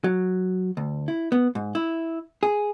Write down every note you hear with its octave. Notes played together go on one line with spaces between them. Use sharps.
F#3
D2
E4
B3
G#2
E4
G#4